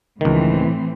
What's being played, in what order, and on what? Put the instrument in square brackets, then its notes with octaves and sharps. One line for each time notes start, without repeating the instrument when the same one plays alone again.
[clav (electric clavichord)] C#2 D#3 [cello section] A2 E3 C4